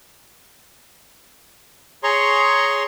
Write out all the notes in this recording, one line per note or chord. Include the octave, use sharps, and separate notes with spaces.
G#4 C#5 A#5 C6 C#6